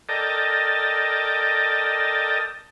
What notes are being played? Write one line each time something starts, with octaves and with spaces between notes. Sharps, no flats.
A4 A#4 D5 D#5 G5 A5